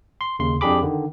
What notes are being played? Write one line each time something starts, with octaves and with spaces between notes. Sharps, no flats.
C6
D#2 C#3 C6
F2 D4 G4 G#4 B5 D6
D3 D#3